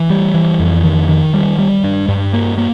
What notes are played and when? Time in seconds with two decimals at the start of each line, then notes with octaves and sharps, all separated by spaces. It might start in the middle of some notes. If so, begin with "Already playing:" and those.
Already playing: E3
0.10 G3
0.34 E3
0.59 F2
0.84 D#3
1.09 D#3
1.34 G3
1.58 G3
1.84 G2
2.08 G2
2.33 A#3
2.58 A#3